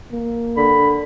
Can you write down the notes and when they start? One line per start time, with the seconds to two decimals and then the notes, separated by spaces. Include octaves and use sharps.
0.12 A#3
0.57 D3 B5